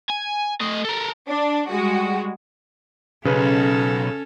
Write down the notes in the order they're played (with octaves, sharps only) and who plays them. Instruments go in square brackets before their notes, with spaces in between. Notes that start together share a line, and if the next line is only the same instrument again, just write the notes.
[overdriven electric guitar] G#5
A3 D#5
A4 A#4
[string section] D4
G3 G#3 F#4
[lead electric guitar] B1 [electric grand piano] C#3 B4 [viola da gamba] C#4 A4